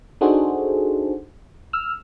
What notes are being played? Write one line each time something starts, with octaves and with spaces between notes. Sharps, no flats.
D4 D#4 F#4 G#4 A4 C5
E6 F6